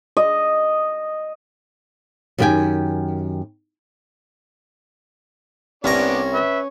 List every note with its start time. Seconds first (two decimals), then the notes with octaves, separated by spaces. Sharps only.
0.17 D#5
2.38 F#2 D#3 G4 F5 G5 G#5
5.84 C2 B3 C#4 D4 D5 A#5
6.33 B4 E5